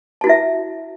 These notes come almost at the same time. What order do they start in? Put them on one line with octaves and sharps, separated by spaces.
A5 F#4 E4 E5